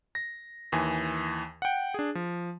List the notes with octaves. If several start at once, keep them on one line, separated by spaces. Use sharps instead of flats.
A#6
D#2 E3 G#5
F#5 G5
D4 G#4
F3